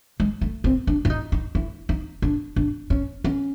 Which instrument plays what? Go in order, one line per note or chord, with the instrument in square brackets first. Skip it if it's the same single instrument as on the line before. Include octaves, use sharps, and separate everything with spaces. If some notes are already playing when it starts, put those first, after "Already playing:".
[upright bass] G#3
A3
C4
D4
E4
D#4
D#4
E4
D#4
D4
D4
C#4
C#4